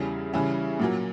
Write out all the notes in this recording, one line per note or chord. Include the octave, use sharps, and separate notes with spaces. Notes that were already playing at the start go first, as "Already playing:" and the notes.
Already playing: E2 C#3 G3 C#4 E4
C#3 E3 G3 C#4 E4
A#2 F#3 A#3